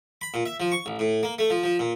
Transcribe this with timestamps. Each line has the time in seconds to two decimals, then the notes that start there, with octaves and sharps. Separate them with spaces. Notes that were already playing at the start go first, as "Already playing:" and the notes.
0.21 B5
0.34 A#2
0.46 E5
0.60 F3
0.72 C#6
0.86 A1
0.99 A2
1.23 A#3
1.39 A3
1.50 F3
1.64 F3
1.79 A#2